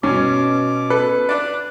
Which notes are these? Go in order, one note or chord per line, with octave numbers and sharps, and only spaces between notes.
G2 B2 C#4 D6
A4 B4
D4 D5 F#6